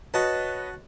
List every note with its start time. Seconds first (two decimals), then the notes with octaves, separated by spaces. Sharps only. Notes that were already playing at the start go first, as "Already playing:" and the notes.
0.14 F#4 B4 C#5 D#5 A5